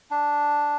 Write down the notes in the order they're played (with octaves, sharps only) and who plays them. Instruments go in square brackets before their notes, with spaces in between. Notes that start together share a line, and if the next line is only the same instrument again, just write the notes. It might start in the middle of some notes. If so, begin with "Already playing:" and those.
[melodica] D4